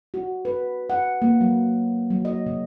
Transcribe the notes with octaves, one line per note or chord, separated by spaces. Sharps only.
F#4
B4
F#5
A#3
F#3
F#3
D#5
C#3